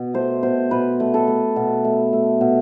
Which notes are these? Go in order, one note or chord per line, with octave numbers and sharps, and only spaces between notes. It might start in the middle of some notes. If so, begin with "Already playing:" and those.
Already playing: B2
A3 C5
B2 C5
B2 B4
A3
A4
A3
B2
A3
A3
B2